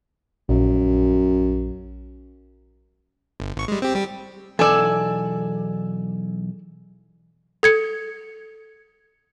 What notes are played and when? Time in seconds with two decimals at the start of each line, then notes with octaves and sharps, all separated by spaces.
0.49 A#1 F#2
3.40 G1
3.57 G#1 C#6
3.68 G3 G#3
3.82 C4 G4
3.95 G3 G4
4.59 B1 E2 A4 D5 G#5 E6
7.63 A4 G#6 C#7